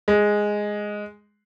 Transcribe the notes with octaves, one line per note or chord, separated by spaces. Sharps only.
G#3